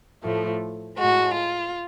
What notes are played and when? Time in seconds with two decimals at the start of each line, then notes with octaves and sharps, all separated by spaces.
0.23 A2 F3 A3
0.97 A2 G#3 F#4
1.34 F4